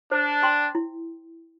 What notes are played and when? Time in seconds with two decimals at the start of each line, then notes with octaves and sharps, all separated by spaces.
0.11 D4 C5
0.43 G5 C6
0.75 E4